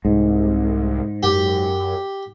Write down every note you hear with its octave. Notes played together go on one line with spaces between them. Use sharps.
C2 G#2
F#2 G4